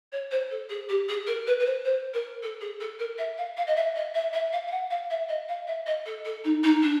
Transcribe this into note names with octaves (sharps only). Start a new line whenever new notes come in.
C#5
C5
A4
G#4
G4
G#4
A#4
B4
B4
C5
C5
A#4
A4
G#4
A4
A#4
E5
F5
F5
D#5
E5
D#5
E5
E5
F5
F5
F#5
F5
E5
D#5
F5
E5
D#5
A4
A4
D#4
D#4
D4